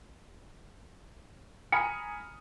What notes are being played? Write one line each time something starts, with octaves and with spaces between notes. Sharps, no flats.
G#5 A#5 B5 D#6 F6 C#7